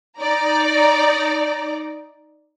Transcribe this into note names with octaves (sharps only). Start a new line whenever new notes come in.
D#4 D5 A#5